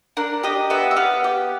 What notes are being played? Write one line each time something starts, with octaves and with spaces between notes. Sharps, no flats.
D4 A#4
G4 D#5
B3 E5
E5
B3 F5
G4